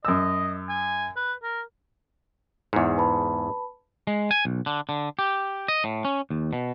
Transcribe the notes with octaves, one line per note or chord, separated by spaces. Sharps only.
F#2 D#5 E6
G#5
B4
A#4
E2 G#2
B4 A5 B5
G#3
G#5
B1
D3
D3
G4
D#5
A2
C#4
D#2
B2